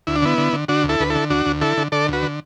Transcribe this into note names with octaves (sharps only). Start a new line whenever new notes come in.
D2 E4
D4
D3 B3 E4
D3
D3
D3 D4 F#4
D2
E4 A4
D2 B4
E4 A4
D3
D2 D4 F#4
D2
D3 E4 A4
D3
D3 A4 D5
D2 F#4 B4
D3